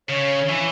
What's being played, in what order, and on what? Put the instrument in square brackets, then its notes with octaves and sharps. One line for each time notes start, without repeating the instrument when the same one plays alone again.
[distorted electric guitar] C#3 [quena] C#5
[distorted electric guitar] E3